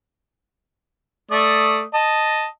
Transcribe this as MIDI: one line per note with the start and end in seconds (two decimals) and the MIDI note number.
1.31 1.82 57
1.31 1.82 74
1.31 1.82 87
1.94 2.46 75
1.94 2.46 81